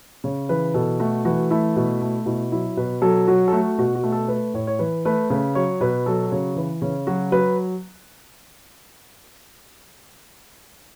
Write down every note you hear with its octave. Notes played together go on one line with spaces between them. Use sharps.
C#3 C#5
E3 B4
B2 A4
A3 F#4
E3 F#4
A3 E4
B2
A3
B2 E4
F#3 E4
B2 B4
F#3 A4
F#3 F#4
A4
A3 F#4
B2 F#4
F#4
A3
A4
A3 B4
A2 C#5
C#5
E3 B4
A3 B4
C#3 B4
F#3 C#5
B2 B4
F#3 A4
C#3 C#5
E3 B4
C#3 C#4
F#3 F#4
F#3 B4